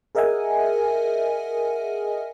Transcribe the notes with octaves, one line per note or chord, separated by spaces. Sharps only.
G#4 A#4 D#5 E5 F#5 G#5